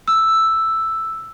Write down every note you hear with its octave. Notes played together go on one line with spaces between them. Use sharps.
E6